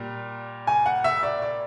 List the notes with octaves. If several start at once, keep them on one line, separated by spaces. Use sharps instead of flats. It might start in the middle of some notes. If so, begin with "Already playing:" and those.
Already playing: A#2 G3 A#3
G#5
F#5
E5
D5
D5